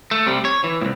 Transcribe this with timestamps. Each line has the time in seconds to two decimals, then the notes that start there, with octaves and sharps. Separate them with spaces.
0.11 A3
0.27 C3 G3
0.45 C#5
0.64 E3
0.81 C2 A2